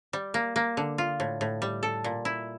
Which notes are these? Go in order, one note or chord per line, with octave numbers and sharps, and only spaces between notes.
G3
A#3
A#3
D3
F4
A2
A2
G3
A4
A#2
E4